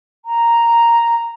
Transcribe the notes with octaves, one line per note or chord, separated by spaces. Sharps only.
A#5